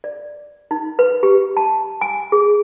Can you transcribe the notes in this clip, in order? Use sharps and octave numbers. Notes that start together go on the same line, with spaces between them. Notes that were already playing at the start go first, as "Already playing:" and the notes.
D5
D#4
B4
G4
A5
G#5
G#4